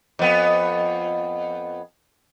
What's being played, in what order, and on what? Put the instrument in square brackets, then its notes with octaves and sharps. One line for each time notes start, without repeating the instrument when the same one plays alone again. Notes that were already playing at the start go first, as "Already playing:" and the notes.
[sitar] F2 B3